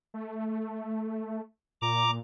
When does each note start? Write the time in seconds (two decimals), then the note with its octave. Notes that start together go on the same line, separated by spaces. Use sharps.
0.14 A3
1.82 A#2 A#5 D6